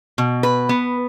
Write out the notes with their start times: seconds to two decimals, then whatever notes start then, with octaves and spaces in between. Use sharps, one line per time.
0.18 B2
0.43 B4
0.69 B3